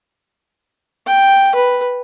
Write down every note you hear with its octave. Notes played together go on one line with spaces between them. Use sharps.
G5
B4